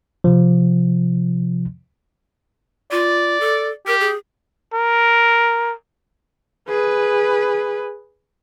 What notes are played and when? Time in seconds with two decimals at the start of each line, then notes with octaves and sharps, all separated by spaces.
0.24 C3 F3
2.91 F4 D5
3.40 A4
3.87 G4 A#4
4.00 G#4
4.74 A#4
6.69 G#4 B4